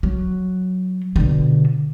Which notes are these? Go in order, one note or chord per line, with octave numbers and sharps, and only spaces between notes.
F#3
B2 D3